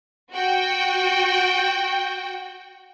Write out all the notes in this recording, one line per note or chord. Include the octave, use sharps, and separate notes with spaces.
F#4 G5